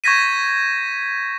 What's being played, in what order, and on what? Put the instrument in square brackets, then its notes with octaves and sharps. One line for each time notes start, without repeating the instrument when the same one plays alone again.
[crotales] C#6 G6 G#6 A#6 B6 D#7